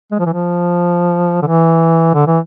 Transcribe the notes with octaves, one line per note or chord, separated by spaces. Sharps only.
G#3
F3
E3
F3
D3
E3
D3
E3